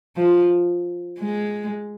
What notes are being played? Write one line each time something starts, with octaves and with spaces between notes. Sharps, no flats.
F3
G#3